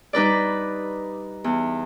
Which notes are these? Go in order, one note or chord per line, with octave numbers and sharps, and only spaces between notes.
G3 D#4 B4 D5
E2